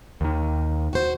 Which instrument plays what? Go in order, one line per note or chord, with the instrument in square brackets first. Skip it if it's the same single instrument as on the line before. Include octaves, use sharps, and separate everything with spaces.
[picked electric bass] D#2 D#3
[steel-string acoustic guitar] F#4 C5